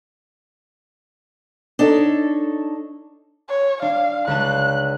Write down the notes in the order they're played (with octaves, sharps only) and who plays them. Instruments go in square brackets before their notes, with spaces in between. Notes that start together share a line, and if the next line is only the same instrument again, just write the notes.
[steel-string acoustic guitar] D4 D#4 A4 C#5
[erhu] C#5
[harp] D4 [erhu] F5
[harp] C#2 D4 A5 [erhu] F#6